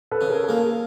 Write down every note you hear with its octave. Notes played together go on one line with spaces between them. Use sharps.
A4 B4
C#3
G#4 A#4
A4
A#3 G#4 A#4